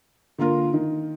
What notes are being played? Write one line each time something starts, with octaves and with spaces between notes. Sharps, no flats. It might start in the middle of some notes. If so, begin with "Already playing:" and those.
D3 A#3 F4 A#4
D#3